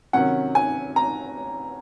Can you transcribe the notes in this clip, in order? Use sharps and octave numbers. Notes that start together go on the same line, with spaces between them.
C3 D#3 F#3 C#4 F#5
G#5
A#5